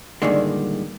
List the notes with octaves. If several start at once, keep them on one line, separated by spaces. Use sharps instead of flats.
G2 A#2 D3 D#3 G#3